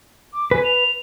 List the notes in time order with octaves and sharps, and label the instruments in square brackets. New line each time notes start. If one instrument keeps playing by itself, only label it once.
[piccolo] D6
[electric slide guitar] B4 [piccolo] G#5
[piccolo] F7